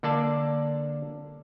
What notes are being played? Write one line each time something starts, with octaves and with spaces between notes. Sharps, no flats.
D3 A#3 D4 A4 D5 A5